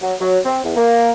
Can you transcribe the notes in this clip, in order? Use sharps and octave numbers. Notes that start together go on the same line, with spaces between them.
F#3
F#3
C4
E2
A#3